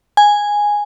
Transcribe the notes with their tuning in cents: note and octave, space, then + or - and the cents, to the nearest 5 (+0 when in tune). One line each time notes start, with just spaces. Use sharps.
G#5 -5